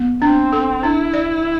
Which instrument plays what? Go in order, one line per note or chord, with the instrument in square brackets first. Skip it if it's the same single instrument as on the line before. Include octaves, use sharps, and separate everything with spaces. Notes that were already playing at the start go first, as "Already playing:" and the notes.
Already playing: [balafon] B3
[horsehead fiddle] C4 [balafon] D4
[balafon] A4
[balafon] D4 [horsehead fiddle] E4
[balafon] D5